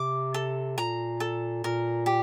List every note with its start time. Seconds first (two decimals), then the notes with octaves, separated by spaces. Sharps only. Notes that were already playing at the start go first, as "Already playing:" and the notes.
Already playing: C3 D6
0.34 A4
0.77 A#2 A#5
1.20 A4
1.64 A#2 A#4
2.06 G4